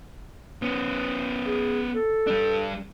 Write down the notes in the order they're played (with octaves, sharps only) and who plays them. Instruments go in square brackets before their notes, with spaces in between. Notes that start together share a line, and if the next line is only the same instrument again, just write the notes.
[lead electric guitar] B3 C#4
[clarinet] G#4
A4
[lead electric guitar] G3 D4